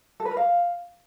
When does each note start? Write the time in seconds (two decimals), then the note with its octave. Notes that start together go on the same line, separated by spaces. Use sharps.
0.20 A4
0.25 B4
0.31 A#4
0.37 F5